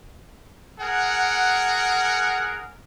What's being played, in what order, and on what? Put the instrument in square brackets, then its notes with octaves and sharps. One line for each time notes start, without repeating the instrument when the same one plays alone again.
[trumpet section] G#4 A#4 F#5